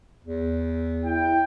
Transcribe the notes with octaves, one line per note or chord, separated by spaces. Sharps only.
E2
E4 G5